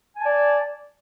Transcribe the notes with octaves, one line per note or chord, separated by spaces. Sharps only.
D5 G#5 A5